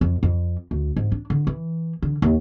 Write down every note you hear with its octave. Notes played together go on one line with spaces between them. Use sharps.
F2
F2
D2
G#2
D4
D3
E3
D3
D#2